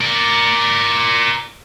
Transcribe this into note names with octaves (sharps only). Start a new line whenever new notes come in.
A#4 D5